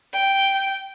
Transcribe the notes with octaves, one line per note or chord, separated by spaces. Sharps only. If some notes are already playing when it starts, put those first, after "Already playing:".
G5